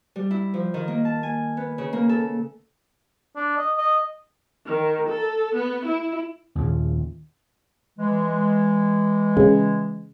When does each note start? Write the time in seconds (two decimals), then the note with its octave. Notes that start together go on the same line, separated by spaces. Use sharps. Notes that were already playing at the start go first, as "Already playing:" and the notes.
0.16 G3
0.31 E4
0.54 F3
0.74 D#3
0.88 A#3
1.05 A5
1.23 G#5
1.57 B3
1.78 C#3
1.93 A#3
2.09 A4
3.36 D4
3.58 D#5
3.78 D#5
4.66 D#3
5.09 A4
5.55 B3
5.85 E4
6.55 D#2 A#2 C#3
7.99 E3 G#3
9.37 C#3